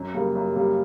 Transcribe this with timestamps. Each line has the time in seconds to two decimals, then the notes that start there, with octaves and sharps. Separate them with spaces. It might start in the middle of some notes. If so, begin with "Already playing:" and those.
Already playing: F#2
0.14 C#3 G3 A#3
0.35 F#2
0.55 C#3 G3 A#3